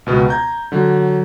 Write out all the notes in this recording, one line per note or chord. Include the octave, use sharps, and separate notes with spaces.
C#2 B2 B3
A#5 G6 G#6
D3 F#3